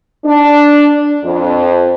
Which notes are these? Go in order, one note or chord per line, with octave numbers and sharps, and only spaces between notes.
D4
F2